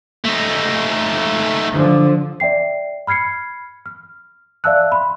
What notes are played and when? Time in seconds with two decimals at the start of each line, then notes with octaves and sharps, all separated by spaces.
0.24 A3 D#4
1.72 D3 F3
2.40 D5 E5 G5 C7
3.07 B5 F6 G#6 C7 C#7
3.86 F6
4.64 D5 E5 F5 A5 E6 F#6
4.92 B5 C6